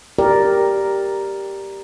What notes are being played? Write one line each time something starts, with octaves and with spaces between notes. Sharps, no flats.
G4 A#4 D5